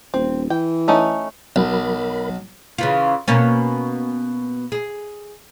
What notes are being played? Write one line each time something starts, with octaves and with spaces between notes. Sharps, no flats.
D#1 C4
E3 G5
A3 C#4 D#4
B1 F#3 A#4 B5
C#3 E3 F4
B2 A#3 C#4
G#4